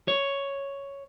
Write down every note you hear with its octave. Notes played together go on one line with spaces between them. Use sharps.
C#5